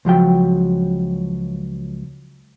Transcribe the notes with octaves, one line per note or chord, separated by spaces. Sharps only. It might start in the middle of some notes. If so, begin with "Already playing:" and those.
C#2 F3 F#3 G5